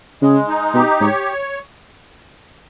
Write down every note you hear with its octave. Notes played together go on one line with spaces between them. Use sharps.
C#3 G#3
D#4
B2 G4
G#2 C#5